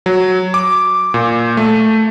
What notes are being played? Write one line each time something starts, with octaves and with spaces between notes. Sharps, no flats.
F#3
D6
A#2
A3